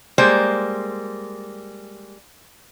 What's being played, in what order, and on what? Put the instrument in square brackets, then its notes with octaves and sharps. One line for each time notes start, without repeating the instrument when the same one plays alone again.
[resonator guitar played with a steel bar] G3 G#3 A#3 C5